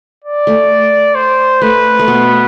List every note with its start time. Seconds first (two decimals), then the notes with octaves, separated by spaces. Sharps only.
0.24 D5
0.47 A3
1.15 C5
1.62 A3 B4
1.99 A3
2.08 B2 B3